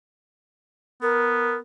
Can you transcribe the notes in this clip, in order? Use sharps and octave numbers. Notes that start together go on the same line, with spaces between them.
B3 A#4